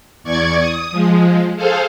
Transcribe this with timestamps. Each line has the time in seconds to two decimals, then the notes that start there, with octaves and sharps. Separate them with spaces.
0.24 E2 D5 C#6 G#6
0.60 D#6
0.91 F3 G#3
1.57 G#4 A4 C5 F5